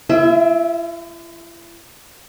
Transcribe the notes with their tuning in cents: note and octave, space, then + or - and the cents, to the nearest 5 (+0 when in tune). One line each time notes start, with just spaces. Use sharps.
E4 +45 E5 -10